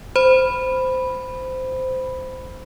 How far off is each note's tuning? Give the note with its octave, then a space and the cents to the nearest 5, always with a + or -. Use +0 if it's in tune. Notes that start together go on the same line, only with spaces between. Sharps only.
C5 -15 B5 +0